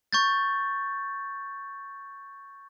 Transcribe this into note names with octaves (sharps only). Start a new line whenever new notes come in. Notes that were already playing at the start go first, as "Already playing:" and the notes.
C#6 G6 A6